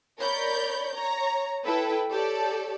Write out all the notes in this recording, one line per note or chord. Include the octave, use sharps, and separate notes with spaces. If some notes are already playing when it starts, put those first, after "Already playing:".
A#4 C#5 D5 B5 G6
C#5 A#5
E4 A4 B4 G5
G4 A4 C#5 D5